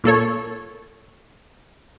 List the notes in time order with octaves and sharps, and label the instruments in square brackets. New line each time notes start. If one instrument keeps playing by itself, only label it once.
[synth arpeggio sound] A#2 A#3 A4 C#5